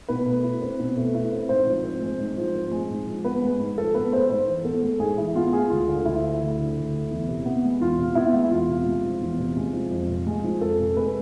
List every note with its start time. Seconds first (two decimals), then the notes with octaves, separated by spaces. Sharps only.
0.09 B2 B4
0.26 A3
0.43 E4
0.61 C4
0.79 B2
0.97 A3
1.14 E4
1.32 C4
1.49 G#2 C5
1.67 F3
1.84 C4
2.02 G#3
2.19 G#2
2.37 F3
2.55 C4
2.71 G#3
2.90 G#2
3.07 F3
3.25 B3 B4
3.43 G#3
3.60 G#2
3.77 F3 A4
3.94 B3 B4
4.12 G#3 C5
4.29 G#2 C5
4.48 E3
4.65 B3 A4
4.82 G#3
4.99 G#2 G#4
5.18 E3 E4
5.35 B3 F4
5.53 G#3 G#4
5.70 D2 F4
5.88 D3
6.05 D2 E4
6.23 A3
6.40 D2
6.58 D3
6.76 D2
6.93 A3
7.11 E2
7.29 C3
7.46 B3
7.64 G#3
7.80 E2 F4
7.98 C3
8.15 B3 E4
8.33 G#3
8.51 E2 F4
8.69 C3
8.86 G#3
9.03 F3
9.21 E2
9.39 C3
9.57 G#3
9.73 F3
9.91 F2
10.09 C3
10.27 G#3
10.44 F3
10.61 F2 A4
10.79 C3
10.97 G#3 B4